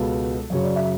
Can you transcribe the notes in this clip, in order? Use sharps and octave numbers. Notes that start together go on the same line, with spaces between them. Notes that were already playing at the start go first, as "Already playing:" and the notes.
Already playing: C#2 B2 G#3 B3 A4
F#2 C#3 F#3 C#5
D5
E5